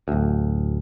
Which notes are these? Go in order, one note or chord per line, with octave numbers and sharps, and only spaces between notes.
D1 D2